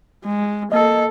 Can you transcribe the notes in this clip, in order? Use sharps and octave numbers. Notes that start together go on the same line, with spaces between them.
G#3
A#3 A4 D#5